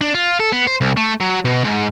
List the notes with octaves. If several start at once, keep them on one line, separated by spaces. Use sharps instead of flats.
D4
F4
A4
B3
C5
C2
A3
F#3
B2
G#2